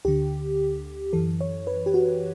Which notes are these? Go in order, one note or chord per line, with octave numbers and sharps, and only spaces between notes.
D2 D3 G4
F#2 E3 A4
C#5
B4
G4
F#4